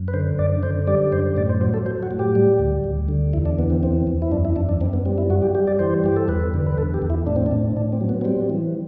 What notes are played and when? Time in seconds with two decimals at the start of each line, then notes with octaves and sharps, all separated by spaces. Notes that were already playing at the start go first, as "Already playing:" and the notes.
Already playing: F#2
0.08 B4
0.14 D3 C5
0.39 F#2 D5
0.63 D3 C5
0.87 G3 D5
1.12 F#2 C5
1.37 A2 D5
1.49 C5
1.61 F#3 C5
1.74 A4
1.86 F#3 C5
2.03 F#4
2.11 A2
2.19 G4
2.35 G3
2.59 D2
2.84 D2
3.08 D3
3.33 E2 E4
3.45 D4
3.59 E3 B3
3.70 C4
3.83 E2 C4
4.07 E2
4.22 E4
4.32 F#2 D4
4.45 E4
4.56 F#2 D4
4.69 D4
4.81 F#2 C4
4.93 B3
5.06 G3 C4
5.18 E4
5.30 G2 F#4
5.42 G4
5.55 G3 G4
5.67 D5
5.79 E3 C5
6.04 G2 G4
6.16 A4
6.28 E2 B4
6.54 D3
6.66 B4
6.78 E2 A4
6.94 G4
7.02 E2
7.10 E4
7.26 A2 D4
7.36 C4
7.46 D4
7.52 A2
7.77 A2 D4
7.92 C4
8.01 F#3
8.09 B3
8.21 B3
8.25 G3 C4
8.50 E3